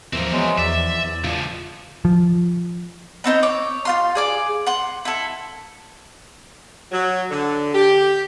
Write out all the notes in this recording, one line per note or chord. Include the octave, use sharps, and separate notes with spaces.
D#2 E3 F3 C4 A#4
F#3 G#3 B3
E2 D5 E5
E2
C#2 F3 F4
F3
B3 C4 D#4 C5
C#5 D6
F4 F5 C6
G#4 D5 D6
F#5 C6
E4 A4
F#3
D3
G4